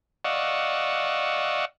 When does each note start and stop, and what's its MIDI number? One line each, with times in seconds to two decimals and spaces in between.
0.25 1.65 74
0.25 1.65 75
0.25 1.65 77
0.25 1.65 78
0.25 1.65 85
0.25 1.65 88